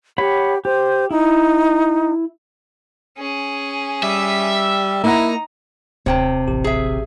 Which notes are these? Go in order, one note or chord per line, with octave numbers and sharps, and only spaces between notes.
G4 C#5 F#5 B5
G4 C5
D#4 E4
C#4 G#4
G3 E5
A#3 D#4 E4 F#5 A#5
D#1 C3 C#5 G5 A5
A1 G4
G#4 E5